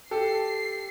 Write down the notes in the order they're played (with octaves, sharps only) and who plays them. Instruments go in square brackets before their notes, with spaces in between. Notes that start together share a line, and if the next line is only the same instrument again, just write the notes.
[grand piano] G4 A4 G5 [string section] C7